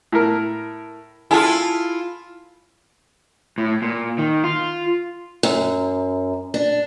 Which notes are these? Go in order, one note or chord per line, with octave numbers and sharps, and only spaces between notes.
A2 A#4
E4 F4 G#4 A4 F6
A2
A#2
D#3
F4
F#2
D4